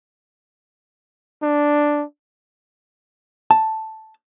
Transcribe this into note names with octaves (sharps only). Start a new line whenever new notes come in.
D4
A5